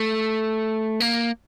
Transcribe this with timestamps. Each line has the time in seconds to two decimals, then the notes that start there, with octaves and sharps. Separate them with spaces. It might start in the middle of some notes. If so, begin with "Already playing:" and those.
Already playing: A3
1.00 A#3